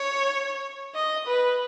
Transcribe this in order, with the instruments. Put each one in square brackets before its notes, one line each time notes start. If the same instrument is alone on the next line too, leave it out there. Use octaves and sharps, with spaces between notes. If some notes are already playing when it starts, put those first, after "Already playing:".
Already playing: [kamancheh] C#5
D#5
B4